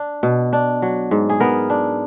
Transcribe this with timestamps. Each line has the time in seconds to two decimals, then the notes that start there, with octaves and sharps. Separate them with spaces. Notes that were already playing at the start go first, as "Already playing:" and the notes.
Already playing: D4
0.23 B2
0.53 D4
0.82 F#3
1.11 G#2
1.29 G#4
1.40 B3 A#4
1.70 D4